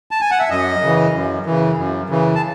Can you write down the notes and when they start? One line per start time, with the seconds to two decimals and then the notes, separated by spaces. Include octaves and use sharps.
0.11 A5
0.21 G#5
0.31 F#5
0.40 E5
0.50 F#2 D#5
0.82 C#3 E3
1.14 F#2
1.46 C#3 E3
1.77 F#2
2.09 C#3 E3
2.35 A5